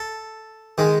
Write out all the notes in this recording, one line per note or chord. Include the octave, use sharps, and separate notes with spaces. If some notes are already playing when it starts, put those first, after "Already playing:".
Already playing: A4
D#3 G#3